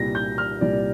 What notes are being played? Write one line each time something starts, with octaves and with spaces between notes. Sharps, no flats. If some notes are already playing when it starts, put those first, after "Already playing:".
Already playing: C2 A#2 G3 A#6
G6
F6
C2 A#2 G3 D5